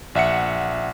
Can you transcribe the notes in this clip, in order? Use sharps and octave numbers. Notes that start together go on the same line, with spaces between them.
A#1 E5 F#5 C#7